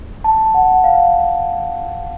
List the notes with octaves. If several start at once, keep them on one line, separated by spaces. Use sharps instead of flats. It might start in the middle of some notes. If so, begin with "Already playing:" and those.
A5
F#5
F5